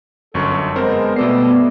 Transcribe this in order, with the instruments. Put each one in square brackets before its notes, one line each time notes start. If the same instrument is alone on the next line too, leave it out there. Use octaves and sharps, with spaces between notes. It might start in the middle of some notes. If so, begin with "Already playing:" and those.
[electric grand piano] G1 F#2 C#6 [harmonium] A4
[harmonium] G#3 B3 [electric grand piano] C4 A#4 C5
[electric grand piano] B2 A4 C7 [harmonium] G3 A3 D5 [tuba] B3